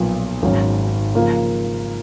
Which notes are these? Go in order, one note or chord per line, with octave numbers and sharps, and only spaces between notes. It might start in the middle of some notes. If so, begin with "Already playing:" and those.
Already playing: B1 A#2 F3 B3 F4
G#1 G#2 F#3 C#4
C#3 F3 A#3